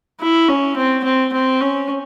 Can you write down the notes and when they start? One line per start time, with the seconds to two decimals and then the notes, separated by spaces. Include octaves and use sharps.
0.21 E4
0.48 C#4
0.76 C4
1.04 C4
1.33 C4
1.61 C#4